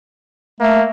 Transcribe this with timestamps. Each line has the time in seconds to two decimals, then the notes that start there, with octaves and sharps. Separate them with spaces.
0.60 A3 A#3